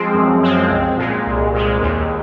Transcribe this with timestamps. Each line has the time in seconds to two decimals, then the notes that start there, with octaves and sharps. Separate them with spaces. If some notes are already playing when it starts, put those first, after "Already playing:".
Already playing: F3 G#3 C4
0.14 F#2
0.43 F3 G#3 C4
0.70 C2
0.98 A#2 G#3
1.26 C2
1.54 A#2 G#3
1.81 D#2